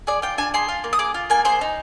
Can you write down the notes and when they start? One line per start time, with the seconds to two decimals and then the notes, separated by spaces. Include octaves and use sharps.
0.07 G#4 D5
0.22 F4 G5
0.38 D4 G#5
0.54 G#4 C6
0.68 F4
0.84 A#3
0.93 D#6
0.99 G#4 D6
1.14 F4
1.30 A#3 G#5
1.45 G#4 C5
1.61 D#4